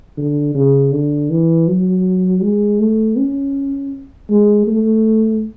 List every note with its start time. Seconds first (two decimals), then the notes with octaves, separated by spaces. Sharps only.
0.18 D3
0.55 C#3
0.92 D3
1.30 E3
1.68 F#3
2.42 G#3
2.80 A3
3.17 C#4
4.30 G#3
4.67 A3